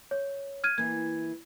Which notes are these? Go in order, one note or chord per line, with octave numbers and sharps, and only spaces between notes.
C#5
F6 G#6 D#7
E3 A#3 G#6